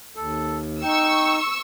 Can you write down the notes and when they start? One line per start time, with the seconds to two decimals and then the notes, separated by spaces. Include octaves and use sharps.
0.16 D#2 A4
0.82 D#4 G5 C#6 E6